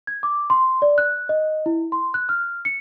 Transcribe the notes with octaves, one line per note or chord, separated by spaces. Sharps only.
G#6
D6
C6
D5
F#6
D#5
E4
C6
F#6
F6
C#7